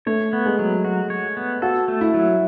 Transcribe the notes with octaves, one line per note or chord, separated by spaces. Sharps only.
A3 C#5
B3
G#3
F#3
F#4
C#5
B3
F#4 A4
A3
E4
F#3